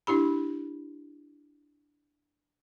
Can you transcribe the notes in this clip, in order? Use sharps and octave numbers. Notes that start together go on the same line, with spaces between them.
D4 E4 G4 B5